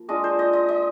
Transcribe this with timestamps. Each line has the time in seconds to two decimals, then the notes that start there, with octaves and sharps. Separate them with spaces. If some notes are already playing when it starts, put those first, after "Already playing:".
Already playing: F3 A#3
0.08 G#3 D4 F4 D#5
0.24 C5
0.39 D#5
0.53 D#5
0.69 D#5